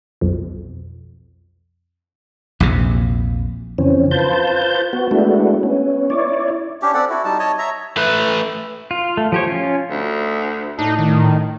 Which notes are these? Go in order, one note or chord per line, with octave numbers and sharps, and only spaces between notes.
B1 F2
A#1 E2 C3
F2 C#3 E3 C4 C#4
F4 B4 C5 A5 G6
B3 F#4
G#3 A3 B3 D4 E4 F#4
B3 C#4
E4 C#5 D5
C#4 D4 G4
C4 A4 D5 F#5
E4 F#4
G3 D#4 A5
C#5 D#5 A5
C#5 E5 A#5
A3 B4
F4
A3
F3 G4 C#5
C#4 F4
D2
A2 D4 D#4
D#3